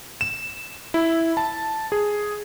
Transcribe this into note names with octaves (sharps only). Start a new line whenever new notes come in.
E7
E4
A5
G#4